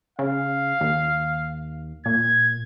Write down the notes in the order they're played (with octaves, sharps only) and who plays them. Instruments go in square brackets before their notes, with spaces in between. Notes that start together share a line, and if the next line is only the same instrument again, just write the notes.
[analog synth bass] C#3 [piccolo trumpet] F5
[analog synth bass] D#2
[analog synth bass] A#2 [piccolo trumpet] G#6